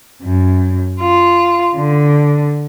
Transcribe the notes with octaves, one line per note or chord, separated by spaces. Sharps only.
F#2
F4
D3